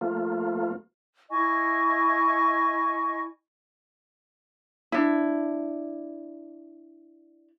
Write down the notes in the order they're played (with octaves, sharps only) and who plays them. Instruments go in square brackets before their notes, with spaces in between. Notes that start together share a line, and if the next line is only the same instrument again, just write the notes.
[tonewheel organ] F3 A3 A#3 F4
[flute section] E4 D#5 G#5 C#6
[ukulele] D4 E4